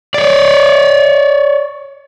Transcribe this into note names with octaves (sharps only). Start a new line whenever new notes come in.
C#5 D5